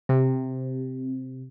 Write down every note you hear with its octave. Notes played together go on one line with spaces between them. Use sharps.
C3